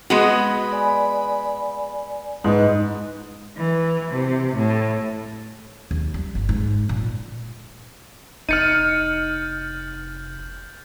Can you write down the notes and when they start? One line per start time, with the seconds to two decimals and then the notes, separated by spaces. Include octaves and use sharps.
0.10 G#3 B3 F#4 B5
0.72 D5 G#5
2.44 G#2 D#4 B4 D#5
3.56 E3
4.11 C3
4.56 A2
5.91 D#2
6.14 G3
6.35 G1
6.49 G#2
6.89 A#2
8.49 F1 D#4 F6 G6 A6 C#7 D#7 F#7